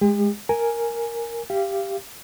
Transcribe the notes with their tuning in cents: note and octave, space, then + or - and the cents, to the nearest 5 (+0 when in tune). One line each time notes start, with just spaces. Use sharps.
G#3 +0 G4 +45
A#4 +0 G#5 +0
G4 +0 F5 -25